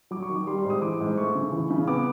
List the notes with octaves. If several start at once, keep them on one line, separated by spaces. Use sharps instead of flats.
F#3 D6
C#6
D#3
D6
G3 C6
C6
G#2
D#6
E3 D6
G#2
A3 C#6
C#3
E3
C#3
B3 D6